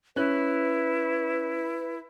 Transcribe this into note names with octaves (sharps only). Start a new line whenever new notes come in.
C#4 E4 B4 F#6